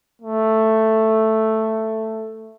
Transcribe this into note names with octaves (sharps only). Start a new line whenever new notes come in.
A3